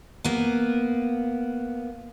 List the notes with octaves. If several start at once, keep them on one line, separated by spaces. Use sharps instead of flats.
A#3 B3